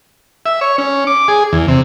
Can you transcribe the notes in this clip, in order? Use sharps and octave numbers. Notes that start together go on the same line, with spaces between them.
E5
C#5
C#4
D6
G#4
E2
C3